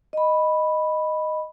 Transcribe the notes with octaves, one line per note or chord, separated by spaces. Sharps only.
D#5 B5